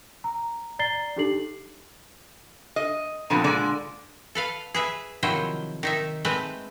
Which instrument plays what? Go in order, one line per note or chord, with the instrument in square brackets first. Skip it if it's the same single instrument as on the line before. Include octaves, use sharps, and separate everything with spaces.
[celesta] A#5
D5 A#5 A6 C7 G7
D4 D#4 G4 A4 C7 F#7
[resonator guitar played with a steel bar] D#5
A#2 D3 F3 B3 C4
A#2 D3 G#3 D5
[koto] A4 B4 F5
G#4 B4 E5
C3 D#3 F3 F#3 E4 C5
D#3 D#4 E5
G#3 A3 C4 B4 E5